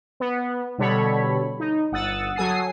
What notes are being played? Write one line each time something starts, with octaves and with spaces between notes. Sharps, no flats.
B3
B2 D3 G3 A4 C#5 B5
D#4
G1 F#5 D#6 E6 A6
F#3 A4 G#5 D#6 C7